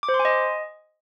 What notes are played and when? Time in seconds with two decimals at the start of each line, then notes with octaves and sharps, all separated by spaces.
0.03 D6
0.09 C5
0.14 C6
0.19 G#5
0.25 D#5